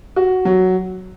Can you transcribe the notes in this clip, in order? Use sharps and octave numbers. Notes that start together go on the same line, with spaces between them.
F#4
F#3